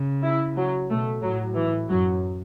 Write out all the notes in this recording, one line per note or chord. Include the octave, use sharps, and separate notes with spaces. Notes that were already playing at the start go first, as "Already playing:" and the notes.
Already playing: C#3
E4
F#3
B2 A3
A2 F#3
E3
F#2 F#3